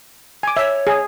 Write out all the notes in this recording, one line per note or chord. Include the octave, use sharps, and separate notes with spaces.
G#5 D6
C#5 E5
G#4